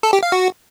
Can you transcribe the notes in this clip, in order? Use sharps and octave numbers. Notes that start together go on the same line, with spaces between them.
A4
G4
F5
F#4